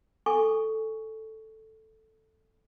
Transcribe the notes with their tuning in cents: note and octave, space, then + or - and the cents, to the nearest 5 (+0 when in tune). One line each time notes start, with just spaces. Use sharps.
A4 +0 G#5 -5 C#6 +10